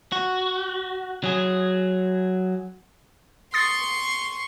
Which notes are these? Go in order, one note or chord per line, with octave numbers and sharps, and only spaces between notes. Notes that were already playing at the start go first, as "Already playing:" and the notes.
F#4
F#3 G#4
C6 C#6 D#6 A6 C7